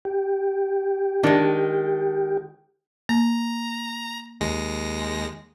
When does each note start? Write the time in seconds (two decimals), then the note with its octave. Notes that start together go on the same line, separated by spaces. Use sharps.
0.05 G4
1.23 D#3 G#3 D4
3.09 A#3 A#5
4.41 D#2 G#3 A#6